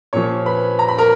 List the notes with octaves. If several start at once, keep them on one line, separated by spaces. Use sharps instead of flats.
A#2 F3 C#5 C#6
B4 B5
A#5
B5
A#4 A#5